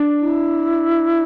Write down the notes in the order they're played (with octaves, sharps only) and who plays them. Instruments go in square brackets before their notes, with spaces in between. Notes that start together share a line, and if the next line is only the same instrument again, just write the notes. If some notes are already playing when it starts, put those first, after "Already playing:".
Already playing: [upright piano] D4
[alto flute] E4